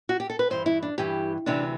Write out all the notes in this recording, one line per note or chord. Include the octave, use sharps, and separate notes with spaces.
F#4
G4
A4
B4
G2 E3 C5
E4
D4
G2 E3 G4
D2 C3 E3 D4